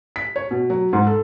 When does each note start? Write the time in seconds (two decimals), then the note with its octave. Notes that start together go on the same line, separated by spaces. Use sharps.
0.16 B6
0.36 C#5
0.51 B2
0.70 F#3
0.93 G#2
1.07 A4